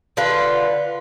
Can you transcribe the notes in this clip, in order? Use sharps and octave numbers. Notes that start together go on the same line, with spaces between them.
D3 F4 B4